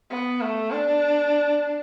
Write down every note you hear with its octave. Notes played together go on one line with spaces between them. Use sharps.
B3
A3
D4